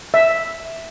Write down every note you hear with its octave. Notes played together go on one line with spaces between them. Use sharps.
E5